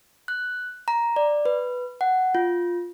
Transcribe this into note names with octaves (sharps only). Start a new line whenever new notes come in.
F#6
A#5
D5
B4
F#5
F4